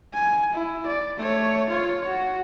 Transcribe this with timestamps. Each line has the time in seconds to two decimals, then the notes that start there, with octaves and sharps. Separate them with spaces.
0.14 G#5
0.54 E4
0.87 D5
1.17 A3 C#5
1.69 F4 C#5
2.07 F#4